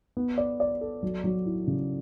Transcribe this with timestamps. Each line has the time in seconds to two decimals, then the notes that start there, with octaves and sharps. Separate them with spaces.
0.17 B3
0.38 D5
0.60 D5
0.81 A4
1.03 F#3
1.24 F#3
1.46 E4
1.67 C#3